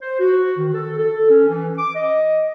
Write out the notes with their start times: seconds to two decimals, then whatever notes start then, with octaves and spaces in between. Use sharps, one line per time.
0.02 C5
0.20 F#4
0.58 D#3
0.73 A4
0.98 A4
1.30 C#4
1.49 E3
1.79 D6
1.95 D#5